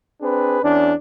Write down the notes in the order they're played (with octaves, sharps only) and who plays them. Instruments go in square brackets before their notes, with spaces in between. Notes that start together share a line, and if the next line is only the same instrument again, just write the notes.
[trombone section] C4 D4 G#4 B4
E2 C#4 D4